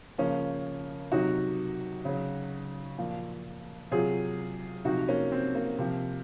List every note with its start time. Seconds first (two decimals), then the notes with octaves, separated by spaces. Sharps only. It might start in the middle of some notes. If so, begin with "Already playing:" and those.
0.18 C#3 F3 A#3 C#4
1.12 C3 F#3 D#4 F#4
2.05 C#3 F#3
2.99 A#2 F3
3.91 C3 F#3 F4 G#4
4.85 C3 F3 D#4 F#4
5.08 A#3 C#4
5.32 C4
5.55 A#3
5.78 C3 F3